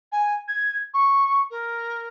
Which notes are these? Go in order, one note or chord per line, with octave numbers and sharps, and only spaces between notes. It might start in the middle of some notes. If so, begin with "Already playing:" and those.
G#5
G#6
C#6
A#4